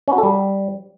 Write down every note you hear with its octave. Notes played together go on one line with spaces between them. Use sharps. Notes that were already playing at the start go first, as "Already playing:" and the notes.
C#4
F#4
A4
G3